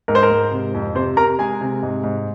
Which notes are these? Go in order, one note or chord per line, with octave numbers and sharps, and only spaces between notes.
G#2 A#4
C5
A#4
G#2
C3
F2
C3 C5
C3 A#4 A#5
G#3 G#4 G#5
C3
G#2
G#2